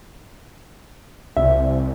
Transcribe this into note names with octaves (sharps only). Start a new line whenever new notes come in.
C2 E5